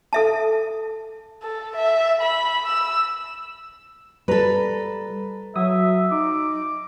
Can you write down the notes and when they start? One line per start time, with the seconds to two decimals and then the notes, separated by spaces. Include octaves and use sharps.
0.13 A4 E5 A5
1.43 A4
1.77 E5
2.22 B5
2.66 E6
4.28 G3 A4 B4 A#5 B5
5.56 F#3 E5 D#6
6.11 D#4 D6